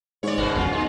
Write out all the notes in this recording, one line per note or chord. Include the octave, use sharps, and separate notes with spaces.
G#2 C#5 D5
G1 F#2 B2 F#4
B1 E2 C#4 F4
G#3 D#4